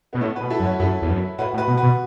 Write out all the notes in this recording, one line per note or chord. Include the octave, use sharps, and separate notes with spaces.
B2 B3
A2 A3 C#4
F#4 B4
B2
E4 A4
F#2
C#4 F#4
F#2 E4 A4
E2
F#2
A2 F#4 B4
A2
F#4 B4
B2
F#4 B4
B2